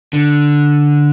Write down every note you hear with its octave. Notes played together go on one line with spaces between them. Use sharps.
D3